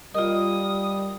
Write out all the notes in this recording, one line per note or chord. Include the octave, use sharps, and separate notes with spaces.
G3 A#3 F4 A#4 D#5 D#6